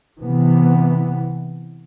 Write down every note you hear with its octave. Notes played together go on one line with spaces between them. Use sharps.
C3 E3 B3